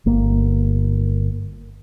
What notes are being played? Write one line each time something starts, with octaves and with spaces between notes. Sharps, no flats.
G1 A#3